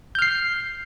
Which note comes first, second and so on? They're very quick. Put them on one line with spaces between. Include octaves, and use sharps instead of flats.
G6 F6 C7